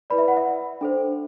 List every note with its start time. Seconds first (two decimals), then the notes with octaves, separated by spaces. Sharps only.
0.10 E4 B4 D5 B5
0.18 E5
0.28 F#5
0.37 E5
0.81 D4 A4 C5